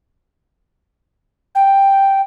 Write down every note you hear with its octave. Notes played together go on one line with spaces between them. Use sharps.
G5